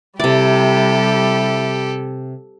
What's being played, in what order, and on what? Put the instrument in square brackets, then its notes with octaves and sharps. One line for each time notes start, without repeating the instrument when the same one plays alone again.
[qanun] C3 D5 [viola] G3 [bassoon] E4 [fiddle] G4 A4